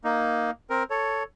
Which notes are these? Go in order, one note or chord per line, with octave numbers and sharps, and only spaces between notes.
A#3 D#4
C4 A#4
A4 C#5